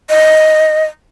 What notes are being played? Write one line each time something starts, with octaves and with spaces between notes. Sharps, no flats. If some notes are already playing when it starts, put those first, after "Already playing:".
D#5